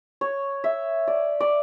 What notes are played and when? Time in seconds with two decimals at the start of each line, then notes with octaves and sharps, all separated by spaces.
0.21 C#5
0.64 E5
1.07 D5
1.40 D5